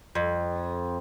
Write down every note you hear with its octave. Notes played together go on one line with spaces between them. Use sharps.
F2